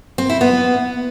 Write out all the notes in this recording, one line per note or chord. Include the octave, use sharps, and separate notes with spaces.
C4
E4
B3